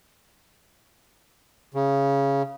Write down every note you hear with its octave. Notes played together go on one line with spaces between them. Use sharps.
C#3